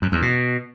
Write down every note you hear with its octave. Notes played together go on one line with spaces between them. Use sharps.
F#2
E2
B2